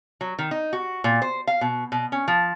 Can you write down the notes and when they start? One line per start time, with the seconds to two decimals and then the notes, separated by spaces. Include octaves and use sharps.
0.21 F#3
0.39 D#3
0.51 D#4
0.73 F#4
1.04 A#2
1.22 C5
1.47 F5
1.61 B2
1.92 B2
2.12 C#4
2.28 F3